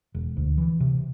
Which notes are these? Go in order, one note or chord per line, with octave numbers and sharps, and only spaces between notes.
E1
D2
E3
C3